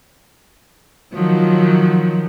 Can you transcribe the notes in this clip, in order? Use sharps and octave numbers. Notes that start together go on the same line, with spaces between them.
D#3 F3 F#3